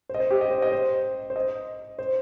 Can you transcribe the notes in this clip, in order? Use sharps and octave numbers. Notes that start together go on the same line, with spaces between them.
C5
D#5
C5
G4
D#5
C5
D#5
C5
C5
D#5
C5